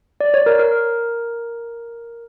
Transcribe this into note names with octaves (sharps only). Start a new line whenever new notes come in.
D5
C#5
A#4
A#4